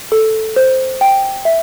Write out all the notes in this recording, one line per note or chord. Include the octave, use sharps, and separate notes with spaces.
A4
C5
G5
E5